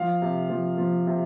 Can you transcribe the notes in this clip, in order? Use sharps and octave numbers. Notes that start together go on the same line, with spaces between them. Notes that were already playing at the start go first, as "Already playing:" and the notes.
Already playing: F3 F5
C3
F3
F3
C3